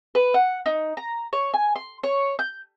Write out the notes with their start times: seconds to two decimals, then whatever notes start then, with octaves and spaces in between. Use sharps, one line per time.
0.15 B4
0.34 F#5
0.66 D#4
0.97 A#5
1.33 C#5
1.53 G#5
1.76 C6
2.03 C#5
2.39 G6